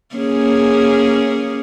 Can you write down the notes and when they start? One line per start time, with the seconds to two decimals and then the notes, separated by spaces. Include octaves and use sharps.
0.15 A#3 C#4 G#4